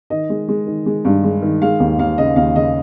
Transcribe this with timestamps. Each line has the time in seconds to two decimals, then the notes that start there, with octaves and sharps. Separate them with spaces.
0.10 D#3 D#5
0.30 G#3
0.48 G#3
0.67 D#3
0.86 G#3
1.05 G2
1.24 G#3
1.42 D#3
1.62 G#3 F5
1.80 D#2
1.99 D#2 F5
2.18 C#3 D#5
2.36 D#2 F5
2.56 C#3 D#5